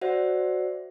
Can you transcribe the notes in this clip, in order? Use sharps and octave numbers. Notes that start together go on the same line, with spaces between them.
F#4 C5 D5 E5 F#5